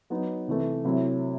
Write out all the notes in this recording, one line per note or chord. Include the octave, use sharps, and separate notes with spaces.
F#3 B3 D#4
C3 E3 A3
C3 F#3 A3 E4